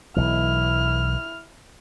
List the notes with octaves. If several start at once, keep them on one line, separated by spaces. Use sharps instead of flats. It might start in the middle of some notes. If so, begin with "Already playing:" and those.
B1 E3 E4 F6